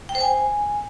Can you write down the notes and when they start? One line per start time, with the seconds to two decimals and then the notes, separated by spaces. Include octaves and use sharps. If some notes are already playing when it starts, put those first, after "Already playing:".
0.09 G5
0.15 C5
0.21 G#5